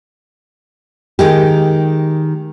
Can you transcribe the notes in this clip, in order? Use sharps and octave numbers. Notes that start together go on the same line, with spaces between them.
D#3 G#3 G4